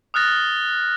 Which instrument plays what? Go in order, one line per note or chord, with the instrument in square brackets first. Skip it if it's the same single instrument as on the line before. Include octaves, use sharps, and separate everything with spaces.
[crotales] D#6 F6 F#6 A6 A#6